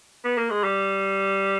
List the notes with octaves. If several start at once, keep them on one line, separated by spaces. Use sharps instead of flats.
B3
A#3
G#3
G3